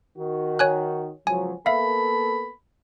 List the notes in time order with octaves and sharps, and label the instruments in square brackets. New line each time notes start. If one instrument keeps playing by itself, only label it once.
[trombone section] D#3 F#4
[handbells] C#5 G#5 F#6
[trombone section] C#2 F3 F#3 [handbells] G#5
[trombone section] A#3 B3 A4 [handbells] E5 F5 [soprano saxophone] B5